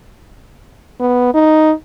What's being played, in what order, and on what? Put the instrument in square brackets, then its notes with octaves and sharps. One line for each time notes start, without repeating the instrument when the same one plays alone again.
[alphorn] B3
D#4